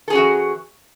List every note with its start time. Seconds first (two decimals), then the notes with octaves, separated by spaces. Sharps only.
0.08 A4
0.10 G#4
0.13 C#4
0.15 F#4
0.18 E3